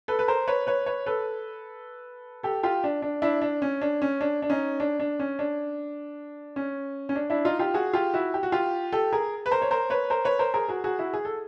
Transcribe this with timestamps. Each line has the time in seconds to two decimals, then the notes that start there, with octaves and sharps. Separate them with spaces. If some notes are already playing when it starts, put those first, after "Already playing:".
0.08 A4 B4
0.19 B4
0.28 A#4 C5
0.47 B4 C#5
0.67 B4 C#5
0.86 B4 C#5
1.06 A4 B4
2.43 G4 A4
2.63 F4 G4
2.84 D4
3.02 D4
3.22 D4 E4
3.42 D4
3.62 C#4
3.82 D4
4.02 C#4
4.21 D4
4.42 D4
4.50 C#4 D#4
4.80 D4
5.00 D4
5.20 C#4
5.39 D4
6.56 C#4
7.09 C#4
7.16 D4
7.30 D4 E4
7.45 D#4 F4
7.59 F4 G4
7.74 F#4 G#4
7.93 F4 G4
8.14 E4 F#4
8.34 G4
8.43 F#4
8.52 F4 G4
8.92 G4 A4
9.13 G#4 A#4
9.46 B4
9.51 A#4 C5
9.62 C#5
9.71 A#4 C5
9.90 B4 C#5
10.10 A#4 C5
10.25 B4 C#5
10.39 A#4 C5
10.54 G#4 A#4
10.69 F#4 G#4
10.84 F#4 G#4
10.99 E4 F#4
11.14 G#4
11.25 A4